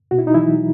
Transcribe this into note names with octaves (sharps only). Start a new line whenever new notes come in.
B2 F#4
E4
D#4
E3 F#3 E4